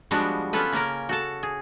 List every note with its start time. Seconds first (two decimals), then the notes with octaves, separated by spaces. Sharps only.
0.11 F3 G3 G#3 B3 D4 F#4
0.53 B3 C#4 F4 A4 B4
0.72 C#3 A#3 C#4 A#4
1.09 F#4 A4 A5
1.43 G#4